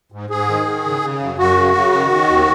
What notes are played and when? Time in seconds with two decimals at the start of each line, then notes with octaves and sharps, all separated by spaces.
0.12 G#2
0.30 G#2 G#4
0.48 D#3
0.66 D#3
0.84 C#3
1.02 C#3
1.20 F#2
1.38 F#2 F#4
1.57 C#3
1.74 C#3
1.92 D#3
2.10 D#3
2.28 D#2